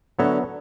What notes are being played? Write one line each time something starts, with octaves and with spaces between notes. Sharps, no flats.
D3 F#3 B3 F#4 C#5 E5